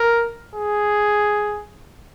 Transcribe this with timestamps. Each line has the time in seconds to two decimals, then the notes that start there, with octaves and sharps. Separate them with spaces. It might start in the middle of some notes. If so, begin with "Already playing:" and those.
Already playing: A#4
0.55 G#4